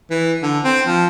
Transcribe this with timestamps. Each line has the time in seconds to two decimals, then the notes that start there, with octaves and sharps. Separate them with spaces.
0.10 E3
0.42 D3
0.64 C4
0.87 F3